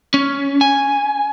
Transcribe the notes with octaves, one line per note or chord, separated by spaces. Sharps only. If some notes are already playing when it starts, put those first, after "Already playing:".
C#4
G#5